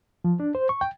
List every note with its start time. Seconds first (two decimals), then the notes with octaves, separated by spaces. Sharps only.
0.24 F3
0.40 D4
0.55 C5
0.69 C#6
0.81 G5